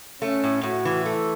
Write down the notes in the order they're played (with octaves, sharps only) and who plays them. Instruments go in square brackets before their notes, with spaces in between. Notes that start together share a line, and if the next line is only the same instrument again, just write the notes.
[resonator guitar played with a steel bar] A3 [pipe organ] C#4
[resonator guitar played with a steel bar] A2
[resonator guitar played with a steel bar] A2 [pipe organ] F#4
[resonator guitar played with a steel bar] E3
[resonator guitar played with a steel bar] A3 [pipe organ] A4